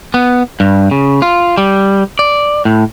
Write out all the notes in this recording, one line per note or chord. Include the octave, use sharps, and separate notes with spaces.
B3
G2
C#3
F4
G3
D5
A2